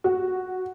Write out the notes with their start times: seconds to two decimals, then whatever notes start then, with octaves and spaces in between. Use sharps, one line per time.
0.04 F#4